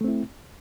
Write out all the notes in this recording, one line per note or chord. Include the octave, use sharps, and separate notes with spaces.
A3 C4 E4